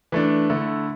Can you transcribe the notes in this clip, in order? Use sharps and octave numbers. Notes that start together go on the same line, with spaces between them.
E3 A3 D4
D3 A3 E4